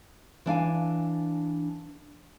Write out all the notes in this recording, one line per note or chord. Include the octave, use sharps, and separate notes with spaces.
E3 D4 F5 G#5